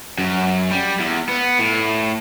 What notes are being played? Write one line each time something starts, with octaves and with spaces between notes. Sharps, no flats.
F#2
G3
E2
B3
A2